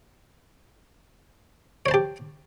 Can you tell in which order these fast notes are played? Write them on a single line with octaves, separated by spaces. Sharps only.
C#5 C5 A5 G4